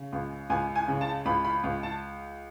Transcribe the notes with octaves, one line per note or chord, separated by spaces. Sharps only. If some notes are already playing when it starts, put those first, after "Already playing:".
Already playing: C#3
C#2
C#2 G#5
G#5
C#3
A5
C#2 B5
B5
C#2
A5